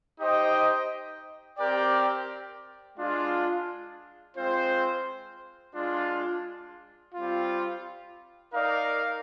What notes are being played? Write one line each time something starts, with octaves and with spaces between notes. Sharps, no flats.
D#4 G4 C5 D#5 G5
C4 G4 A#4 D5 G5
G#3 D4 F4
G#3 C4 F4 C5
G#3 D4 F4
G3 C4 F4
D#4 A#4 D5 F5